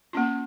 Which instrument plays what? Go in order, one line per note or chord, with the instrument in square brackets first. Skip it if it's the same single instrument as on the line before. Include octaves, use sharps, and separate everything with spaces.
[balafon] A#3 C#4 F4